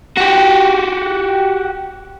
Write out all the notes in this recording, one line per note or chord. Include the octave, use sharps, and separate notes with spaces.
F#4 G4